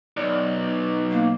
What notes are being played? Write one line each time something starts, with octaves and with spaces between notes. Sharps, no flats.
B1 D5
A#3